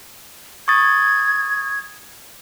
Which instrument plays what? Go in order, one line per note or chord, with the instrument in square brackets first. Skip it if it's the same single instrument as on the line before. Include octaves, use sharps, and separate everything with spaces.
[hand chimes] C#6 D#6 A6 [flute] G#6